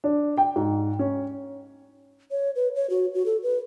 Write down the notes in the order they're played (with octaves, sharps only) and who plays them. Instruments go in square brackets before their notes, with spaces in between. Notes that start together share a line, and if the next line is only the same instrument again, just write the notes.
[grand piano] D4
G5
G#2
C#4
[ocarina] C#5
B4
C#5
F#4
F#4
A4
B4